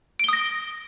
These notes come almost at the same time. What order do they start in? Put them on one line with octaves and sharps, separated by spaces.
D7 G7 D#6 A#6